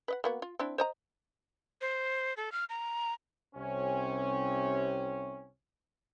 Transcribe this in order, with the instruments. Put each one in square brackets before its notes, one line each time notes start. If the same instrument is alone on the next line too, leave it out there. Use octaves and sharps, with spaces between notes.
[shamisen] B4 D#5 F#5
A#3 B3 F#4
F4
C4 D4 E4
C5 D#5 A#5
[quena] C5
A4
F6
A#5
[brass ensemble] C2 C3 C#4